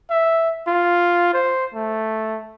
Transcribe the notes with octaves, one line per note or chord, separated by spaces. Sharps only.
E5
F4
C5
A3